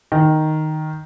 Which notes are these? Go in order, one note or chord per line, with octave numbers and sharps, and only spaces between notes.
D#3